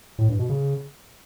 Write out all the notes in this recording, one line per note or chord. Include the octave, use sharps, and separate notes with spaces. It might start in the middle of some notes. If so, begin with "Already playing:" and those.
A2
G2
B2
C#3